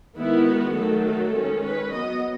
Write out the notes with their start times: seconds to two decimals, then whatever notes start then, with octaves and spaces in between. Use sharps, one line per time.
0.17 D#3 G#3 B3 E4
0.46 F#4
0.75 D#3 F#3 A3 A4
1.05 A4
1.34 D#3 G#3 C#4
1.63 B4
1.92 F#3 B3 D#5